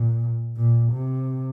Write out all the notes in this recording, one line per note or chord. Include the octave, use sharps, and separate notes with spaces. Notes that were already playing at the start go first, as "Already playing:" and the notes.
Already playing: A#2
A#2
C3